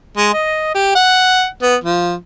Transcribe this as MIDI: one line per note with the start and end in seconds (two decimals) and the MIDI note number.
0.16 0.28 56
0.33 0.74 75
0.74 0.94 67
0.95 1.45 78
1.62 1.75 59
1.83 2.14 53